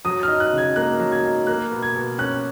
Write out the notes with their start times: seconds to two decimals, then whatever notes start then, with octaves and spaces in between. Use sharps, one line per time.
0.05 F#3 D#6
0.23 F6
0.28 D#4
0.40 F#6
0.53 C#3 G#6
0.76 A#3 F#6
1.00 F#3
1.12 G#6
1.23 D#4
1.47 A#3 F#6
1.71 B2
1.83 G#6
1.96 B2
2.19 C#4 F#6